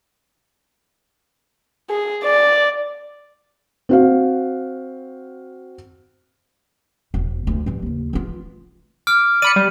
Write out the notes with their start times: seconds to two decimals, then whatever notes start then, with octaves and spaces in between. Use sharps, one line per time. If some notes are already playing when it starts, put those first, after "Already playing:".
1.90 G#4
2.24 D5
3.89 C4 F#4 F5
7.14 E1
7.47 D2
7.66 E3 G3
7.82 D#2 C#3
8.13 E3 F4
9.07 D6 F6
9.42 D5 B5 C#7 D#7
9.56 G3